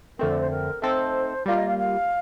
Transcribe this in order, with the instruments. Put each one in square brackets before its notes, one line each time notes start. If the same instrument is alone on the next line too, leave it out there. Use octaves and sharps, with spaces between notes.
[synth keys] F2 D3 A3 C4 [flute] A#4
[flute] D5
C5
A#4
[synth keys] A3 C4 D#4 A4 [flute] C5
[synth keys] G3 A#3 F4 [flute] D5
[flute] D#5
F5
F5